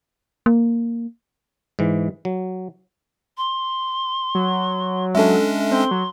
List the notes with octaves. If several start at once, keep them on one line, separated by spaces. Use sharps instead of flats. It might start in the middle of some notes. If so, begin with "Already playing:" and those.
A#3
G#2 E3
F#3
C6
F#3
G#3 C#4 D4 A4 E5
C4 C6
F#3